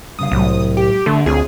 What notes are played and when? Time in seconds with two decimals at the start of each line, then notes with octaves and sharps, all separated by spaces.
0.19 G2 C#3 F5 D#6
0.32 C2 A2 F#3
0.77 G4
1.06 D3 A3
1.26 D2 C4 F4 G#4 C#5